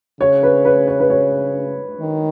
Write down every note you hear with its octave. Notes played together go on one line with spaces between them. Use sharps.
C#3 C#5
B4
B4
C#5
B4
C#5
D#3